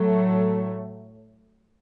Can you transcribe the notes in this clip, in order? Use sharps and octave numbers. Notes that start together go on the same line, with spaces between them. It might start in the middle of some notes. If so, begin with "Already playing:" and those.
Already playing: A2 F#3 A3